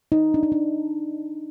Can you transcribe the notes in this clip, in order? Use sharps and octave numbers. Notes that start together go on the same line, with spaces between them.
D#4
D4
D#4
D4